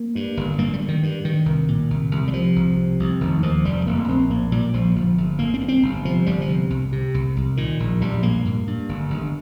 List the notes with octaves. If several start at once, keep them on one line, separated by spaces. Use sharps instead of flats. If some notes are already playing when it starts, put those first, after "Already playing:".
Already playing: A#3
G2
G1
G2 A#3
G3
G2
D#3
G2
G2 D#3
C2
A#2
C2
C2
G3
C3 F3
C2
C3
C2
F1 D#3
D#2 F3
F1 G3
F1 A#3
A#1 C4
A#2 A#3
A#2 G3
A#1 F3
G1 F3
G1
G1 A#3
C4
G2
C4
G1
C3 F3
G1 G3
F3
C3
C2
C3
C2
C2
A#2 D#3
A#1
A#1 G3
A#2 A#3
G2
G2
G1
G1